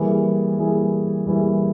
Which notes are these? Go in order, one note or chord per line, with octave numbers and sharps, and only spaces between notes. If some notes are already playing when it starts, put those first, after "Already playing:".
Already playing: E3 G3 A#3 E4 G#4
E3 G3 A#3 E4 G#4
E3 G3 A#3 E4 G#4